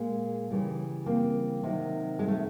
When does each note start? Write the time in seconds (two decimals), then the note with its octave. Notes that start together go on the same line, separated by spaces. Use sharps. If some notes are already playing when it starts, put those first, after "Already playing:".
Already playing: A#2 G#3 A#3
0.50 C#3 E3 G3
1.06 A#3 C4
1.63 C3 D#3 F#3
2.19 G#3
2.28 A3